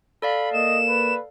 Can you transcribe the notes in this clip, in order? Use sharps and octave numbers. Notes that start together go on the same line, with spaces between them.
A4 D5 F5 B5
A#3 D#5 E7
B4